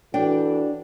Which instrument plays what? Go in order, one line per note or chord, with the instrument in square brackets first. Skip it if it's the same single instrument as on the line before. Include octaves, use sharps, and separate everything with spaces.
[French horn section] E3 F#4 A4 [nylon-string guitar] D4 D5 G5